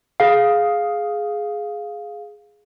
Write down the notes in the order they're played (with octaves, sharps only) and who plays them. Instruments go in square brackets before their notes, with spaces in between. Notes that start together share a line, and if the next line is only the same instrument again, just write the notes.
[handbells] G#4 F5